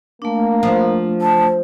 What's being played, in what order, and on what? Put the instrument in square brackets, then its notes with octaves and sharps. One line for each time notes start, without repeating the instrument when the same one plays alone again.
[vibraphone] A3 D4 [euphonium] A#3
[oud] F3
[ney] A5